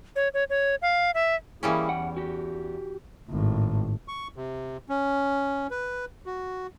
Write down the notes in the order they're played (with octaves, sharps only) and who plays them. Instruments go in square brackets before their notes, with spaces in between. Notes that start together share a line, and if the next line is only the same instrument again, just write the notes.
[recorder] C#5
C#5
C#5
F5
E5
[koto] E3 G3 C#4 [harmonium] A#3 E4 G#4
[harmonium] E2 [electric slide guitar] F#5 G5
[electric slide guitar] F#4 G4
[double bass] G#1 A2
[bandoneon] C#6
C3
C#4
B4
F#4